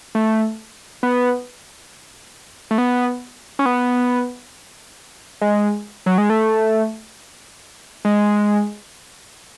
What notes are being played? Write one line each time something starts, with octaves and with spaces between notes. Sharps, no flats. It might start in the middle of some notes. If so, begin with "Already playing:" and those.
A3
B3
A3
B3
C#4
B3
G#3
F#3
G#3
A3
G#3